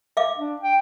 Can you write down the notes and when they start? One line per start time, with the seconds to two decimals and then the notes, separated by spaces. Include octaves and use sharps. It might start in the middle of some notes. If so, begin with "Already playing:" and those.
0.17 E5 F5 D6
0.37 D4
0.61 G5